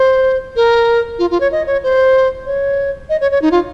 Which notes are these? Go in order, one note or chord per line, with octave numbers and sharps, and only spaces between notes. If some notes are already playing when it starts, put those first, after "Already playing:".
Already playing: C5
A#4
F4
F4
C#5
D#5
C#5
C5
C#5
D#5
C#5
C#5
D#4
F4